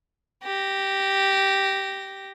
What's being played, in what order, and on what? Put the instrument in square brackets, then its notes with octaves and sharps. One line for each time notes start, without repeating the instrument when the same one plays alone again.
[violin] G4 A#6